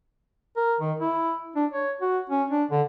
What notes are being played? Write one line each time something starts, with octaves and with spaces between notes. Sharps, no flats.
A#4
D#3
E4
D4
C#5
F#4
C#4
D4
D3